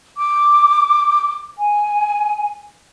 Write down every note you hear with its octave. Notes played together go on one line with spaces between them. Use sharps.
D6
G#5